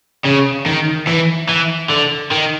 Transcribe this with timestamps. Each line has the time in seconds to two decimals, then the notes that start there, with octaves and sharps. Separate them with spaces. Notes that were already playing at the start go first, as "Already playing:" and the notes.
0.25 C#3
0.66 D#3
1.07 E3
1.49 E3
1.90 D3
2.31 D#3